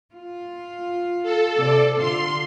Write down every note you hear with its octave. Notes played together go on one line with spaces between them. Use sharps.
F4
A4
C3 D5
D3 F4 F5 C6